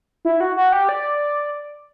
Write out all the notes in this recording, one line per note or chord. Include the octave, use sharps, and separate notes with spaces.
E4
F#4
F#4
G4
D5